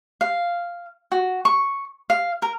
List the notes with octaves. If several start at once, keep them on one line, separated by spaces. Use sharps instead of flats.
F5
F#4
C#6
F5
A#4